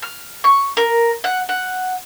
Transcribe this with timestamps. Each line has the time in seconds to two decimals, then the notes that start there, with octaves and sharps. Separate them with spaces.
0.02 F6
0.44 C#6
0.77 A#4
1.24 F#5
1.49 F#5